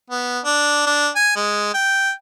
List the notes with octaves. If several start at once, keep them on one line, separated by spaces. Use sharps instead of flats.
B3
D4
D4
G#5
G#3
G5